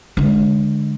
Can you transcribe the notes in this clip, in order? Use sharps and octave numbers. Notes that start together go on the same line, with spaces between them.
D3 G#3